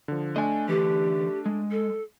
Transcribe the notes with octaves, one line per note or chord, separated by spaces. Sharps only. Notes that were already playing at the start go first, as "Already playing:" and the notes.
D3 F3
A3 D4 D#5 G#5
D3 E3 G4
G#3
A4